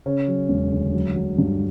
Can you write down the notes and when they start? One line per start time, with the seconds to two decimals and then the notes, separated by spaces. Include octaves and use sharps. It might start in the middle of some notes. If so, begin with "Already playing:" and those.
0.06 C#3 C#4
0.28 F#3
0.49 E1
0.71 D2
0.94 F#3
1.15 F#3
1.38 G2